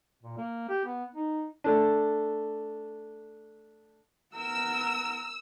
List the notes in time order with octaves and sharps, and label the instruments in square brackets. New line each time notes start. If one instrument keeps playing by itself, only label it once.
[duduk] A#2
A#3
G4
B3
D#4
[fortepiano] A3 D4
[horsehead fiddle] B3 A#4 [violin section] E6